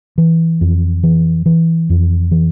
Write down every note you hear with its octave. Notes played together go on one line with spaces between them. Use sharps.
E3
F2
E3
E3
F2
E3